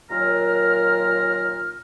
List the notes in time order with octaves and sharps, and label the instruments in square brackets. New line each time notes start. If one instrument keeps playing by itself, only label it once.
[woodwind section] D#2 A#2 F#3 A#5 F6